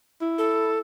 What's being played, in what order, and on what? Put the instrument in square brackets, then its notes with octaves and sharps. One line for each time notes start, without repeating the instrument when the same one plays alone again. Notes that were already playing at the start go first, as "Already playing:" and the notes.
[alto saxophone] E4
[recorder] A4